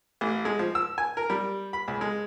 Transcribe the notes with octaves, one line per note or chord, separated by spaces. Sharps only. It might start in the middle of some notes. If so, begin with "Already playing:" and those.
A1
G#3
F3
E6
G#5
A#4
G3
B5
C#2
G#3